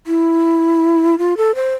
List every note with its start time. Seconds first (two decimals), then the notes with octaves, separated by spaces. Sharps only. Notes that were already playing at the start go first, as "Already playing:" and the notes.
0.07 E4
1.18 F4
1.37 A4
1.55 C5